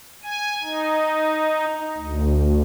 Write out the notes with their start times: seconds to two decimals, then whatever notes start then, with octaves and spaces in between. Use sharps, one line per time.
0.23 G#5
0.63 D#4
1.97 D2